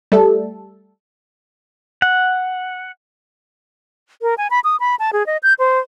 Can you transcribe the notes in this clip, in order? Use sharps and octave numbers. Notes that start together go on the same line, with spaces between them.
G3 A3 A4
F#5
A#4
G#5
B5
D#6
B5
A5
G#4
D#5
G6
C5